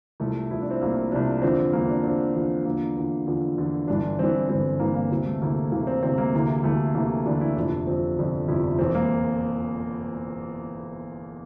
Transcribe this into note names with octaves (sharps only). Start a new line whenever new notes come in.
C2 C3 F3 A3
C2 C3 F3 E4
D4
C4
C2 C3 F3 A#3
C2 C3 F3 D4
E2 D3 F3 C4
E2 D3 F3 A#3
D4
E2 D3 F3 C4
E2 D3 F3
E2 D3 F3 A#3
E2 D3 F3
E2 D3 F3
E2 D3 F3
G1 G2 E3 D4
G1 G2 E3 C4
G1 G2 E3 C4
G1 G2 E3 A#3
A#3
D2 C3 E3 C4
A3
D2 C3 E3 A#3
D2 C3 E3 A#3
C4
D2 C3 E3 C4
A#3
D2 C3 E3
D2 C3 E3 A3
D2 C3 E3 A#3
D2 C3 E3 D4
E4
G1 F2 C3 F3 D4
G1 F2 C3 F3 C4
G1 F2 C3 F3 D4
G1 F2 C3 F3 E4
D4
E1 E2 E3 C4
A#3